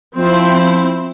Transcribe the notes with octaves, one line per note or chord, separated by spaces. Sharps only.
F3 C4 E4